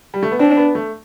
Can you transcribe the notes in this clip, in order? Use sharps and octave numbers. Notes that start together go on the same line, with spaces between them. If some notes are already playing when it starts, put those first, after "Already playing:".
G3
A3
B3
C4 D4
B3
A3